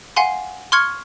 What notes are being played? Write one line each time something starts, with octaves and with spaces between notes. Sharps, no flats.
F5 F#5 G#5 C6
C6 C#6 F6 G#6 C#7